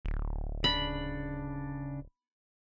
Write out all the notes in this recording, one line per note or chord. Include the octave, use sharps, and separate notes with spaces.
D1
C#3 D4 B5